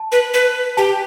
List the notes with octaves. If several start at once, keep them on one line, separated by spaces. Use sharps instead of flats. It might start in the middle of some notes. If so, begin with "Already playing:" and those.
Already playing: A5
B4
B4
G4 A5